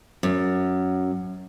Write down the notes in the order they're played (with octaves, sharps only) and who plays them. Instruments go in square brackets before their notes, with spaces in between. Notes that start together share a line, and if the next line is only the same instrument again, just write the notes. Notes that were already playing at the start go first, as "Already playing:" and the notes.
[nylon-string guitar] F#2